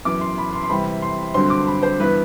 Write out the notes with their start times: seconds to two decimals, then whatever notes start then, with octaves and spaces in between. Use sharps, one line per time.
0.05 F#2 E3 B3 D6
0.21 C6
0.38 B5
0.53 C6
0.64 C6
0.69 C3 E3 G3 B5
1.02 C6
1.34 G2 D3 F#3 C4 C6
1.50 D6
1.67 B5
1.83 C5
1.99 G2 E3 B3 B4